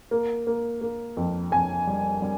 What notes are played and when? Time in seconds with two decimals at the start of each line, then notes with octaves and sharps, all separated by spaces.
0.11 A#3
0.47 A#3
0.81 A#3
1.17 F2
1.51 F2 G#5
1.87 G3
2.22 G3